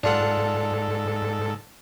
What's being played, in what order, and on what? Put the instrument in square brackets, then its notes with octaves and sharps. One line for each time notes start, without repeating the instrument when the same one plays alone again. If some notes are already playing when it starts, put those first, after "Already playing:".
[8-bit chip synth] G#2 A4 [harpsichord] D4 F4 F#5